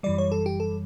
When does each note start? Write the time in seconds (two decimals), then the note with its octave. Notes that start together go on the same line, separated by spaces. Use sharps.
0.03 F#2 E3 G3 D5
0.18 C#5
0.32 A4
0.46 G4
0.60 A4